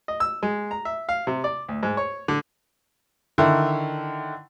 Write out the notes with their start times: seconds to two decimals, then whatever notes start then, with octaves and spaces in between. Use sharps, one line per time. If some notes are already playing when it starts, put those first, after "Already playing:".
0.08 D#5
0.20 E6
0.43 G#3
0.71 A#5
0.85 E5
1.09 F5
1.27 C3
1.44 D5
1.68 D2
1.83 G#2
1.97 C#5
2.28 D3
3.38 D3 D#3 E4